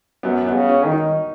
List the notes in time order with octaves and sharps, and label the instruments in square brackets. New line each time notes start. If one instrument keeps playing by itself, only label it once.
[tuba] F#2 [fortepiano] B3
[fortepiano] B3
[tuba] C#3
[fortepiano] C#4
[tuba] D#3
[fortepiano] D#4